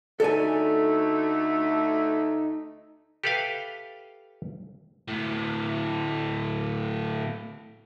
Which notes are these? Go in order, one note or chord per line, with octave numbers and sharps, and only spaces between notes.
D2 A3 D#4 A4 D5 G#5
G4 A4 B4 E5 F5 G5
D2 A2